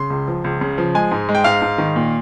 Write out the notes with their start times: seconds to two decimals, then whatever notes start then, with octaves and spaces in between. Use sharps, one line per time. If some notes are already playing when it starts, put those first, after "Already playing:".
Already playing: C#3 C6
0.10 C#2
0.28 F3
0.44 C#2
0.61 C#3
0.78 F3
0.95 G#3 G#5
1.11 G#2
1.29 G#3
1.35 G5
1.44 G#2 F5
1.62 G#2
1.78 D#3
1.96 A#2